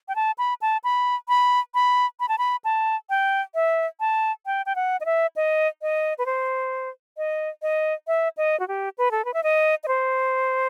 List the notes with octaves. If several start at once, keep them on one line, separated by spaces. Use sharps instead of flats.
G5
A5
B5
A5
B5
B5
B5
B5
A5
B5
A5
G5
E5
A5
G5
G5
F#5
D#5
E5
D#5
D#5
B4
C5
D#5
D#5
E5
D#5
F#4
G4
B4
A4
B4
E5
D#5
D#5
C5